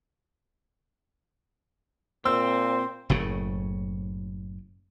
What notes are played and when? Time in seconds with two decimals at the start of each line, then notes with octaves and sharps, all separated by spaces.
2.25 A#2 C4 C5 E6
3.10 F#1 A2 C#3